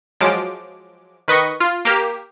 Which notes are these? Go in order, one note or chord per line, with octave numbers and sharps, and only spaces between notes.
F3 F#3 G#3 D6
D#3 B4 D#5 C#6
F4
A#3 G4 A#4